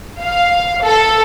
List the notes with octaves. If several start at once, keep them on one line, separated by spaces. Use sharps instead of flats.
F5
A4